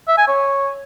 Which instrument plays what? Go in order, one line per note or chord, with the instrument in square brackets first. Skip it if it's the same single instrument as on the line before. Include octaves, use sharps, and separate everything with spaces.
[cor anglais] E5
G#5
C#5